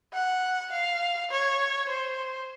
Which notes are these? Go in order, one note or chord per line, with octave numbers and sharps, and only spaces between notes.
F#5
F5
C#5
C5